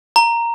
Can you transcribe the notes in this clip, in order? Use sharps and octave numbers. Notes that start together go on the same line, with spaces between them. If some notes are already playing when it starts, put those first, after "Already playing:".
A#5